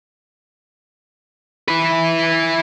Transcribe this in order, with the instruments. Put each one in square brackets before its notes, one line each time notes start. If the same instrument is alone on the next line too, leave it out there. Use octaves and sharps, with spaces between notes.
[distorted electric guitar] E4 B4